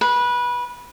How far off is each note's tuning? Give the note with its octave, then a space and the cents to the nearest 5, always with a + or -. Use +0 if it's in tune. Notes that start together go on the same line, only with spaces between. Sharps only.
B4 -20